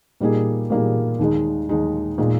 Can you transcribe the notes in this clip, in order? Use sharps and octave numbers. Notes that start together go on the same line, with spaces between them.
A#2 G3 A#3 D#4 G#4
A#2 G3 A#3 D#4 G#4
D#2 D#3 G#3 D#4
D#2 D#3 G#3 D#4
A#2 G#3 D#4